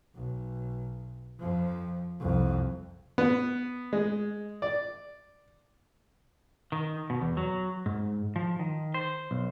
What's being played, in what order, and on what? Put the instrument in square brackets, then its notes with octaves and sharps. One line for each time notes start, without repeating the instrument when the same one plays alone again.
[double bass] B1
F2 F3
C2 F2
[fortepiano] B3
G#3
D5
[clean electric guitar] D#3
B2
E2
F#3
G#2
F3
D#3
C5
B1